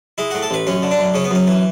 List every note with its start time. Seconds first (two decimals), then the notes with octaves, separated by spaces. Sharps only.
0.18 G#3 E4
0.31 A2 F#4
0.43 A4
0.50 A1 B4
0.67 F#2 C#4
0.83 D3
0.91 D4
0.98 F#2
1.14 C#3 C#4
1.24 B3
1.31 F#2 C#4
1.47 E3